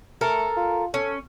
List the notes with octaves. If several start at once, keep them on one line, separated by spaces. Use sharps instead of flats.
A3 A4 A#4
F4
C#4 A4